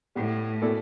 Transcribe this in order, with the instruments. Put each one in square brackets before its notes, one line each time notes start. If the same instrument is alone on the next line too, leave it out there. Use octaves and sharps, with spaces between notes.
[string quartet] A2 [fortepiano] G3 B3 E4 G4
[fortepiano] B2 A3 E4 A4 D5